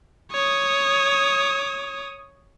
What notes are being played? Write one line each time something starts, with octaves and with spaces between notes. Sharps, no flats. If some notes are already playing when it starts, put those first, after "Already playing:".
C#5 D#6